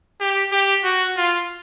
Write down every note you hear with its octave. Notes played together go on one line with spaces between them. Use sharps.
G4
G4
F#4
F4